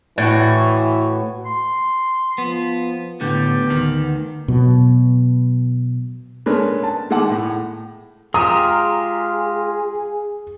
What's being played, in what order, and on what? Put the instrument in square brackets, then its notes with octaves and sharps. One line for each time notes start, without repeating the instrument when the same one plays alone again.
[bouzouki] A2 F#4 [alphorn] E3
[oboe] C6
[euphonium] F3 [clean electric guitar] B3
[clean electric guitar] A2 D3 [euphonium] B3 [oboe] G4
[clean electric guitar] D2 D#3
[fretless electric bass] B2 F#3
[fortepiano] G#3 A3 C#4 D4 A#4 B4
A5
D#3 G#3 A3 A4 F#5 D6
A2
[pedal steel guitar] G#3 F4 G4 [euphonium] G#4 [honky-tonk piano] A#5 [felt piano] D#6